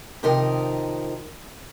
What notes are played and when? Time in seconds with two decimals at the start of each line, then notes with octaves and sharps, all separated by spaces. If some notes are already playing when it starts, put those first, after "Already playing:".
0.23 C3 D#3 F3 D#4 A#4